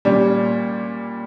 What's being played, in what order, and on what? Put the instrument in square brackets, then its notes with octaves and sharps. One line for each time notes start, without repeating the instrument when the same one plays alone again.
[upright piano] A#2 G3 C#4